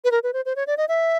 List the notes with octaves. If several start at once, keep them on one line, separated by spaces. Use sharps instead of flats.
B4
A#4
B4
C5
C5
C#5
D5
D#5
E5